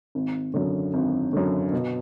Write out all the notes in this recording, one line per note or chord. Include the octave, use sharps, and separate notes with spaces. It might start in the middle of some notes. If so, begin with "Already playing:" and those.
G#1
F#2 D3
G#1
F#2 D3
B2